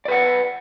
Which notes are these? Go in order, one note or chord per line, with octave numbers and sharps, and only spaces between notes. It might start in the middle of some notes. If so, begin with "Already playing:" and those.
B4 D5 F#5